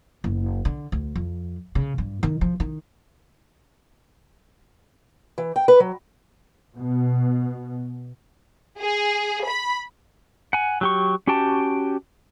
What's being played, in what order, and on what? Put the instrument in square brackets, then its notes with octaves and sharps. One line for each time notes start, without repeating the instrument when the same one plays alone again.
[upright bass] F#1
D3
D2
F2
C#3
G2
D#3
F3
D#3
[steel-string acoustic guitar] E3
G5
B4
F#3
[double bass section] B2
[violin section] G#4
B5
[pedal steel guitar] F#5 G#5
F#3 G4 C#6
C#4 F#4 G4 G5 A5